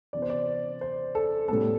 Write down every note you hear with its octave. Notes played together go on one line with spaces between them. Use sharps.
C3 E3 B3 D5
C5
D5
C5
A4
A2 G3 B3 A4